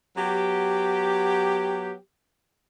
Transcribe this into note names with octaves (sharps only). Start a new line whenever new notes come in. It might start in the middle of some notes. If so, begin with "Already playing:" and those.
F#3 B3 G4